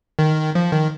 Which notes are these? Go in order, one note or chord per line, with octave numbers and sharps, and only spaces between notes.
D#3
F3
D#3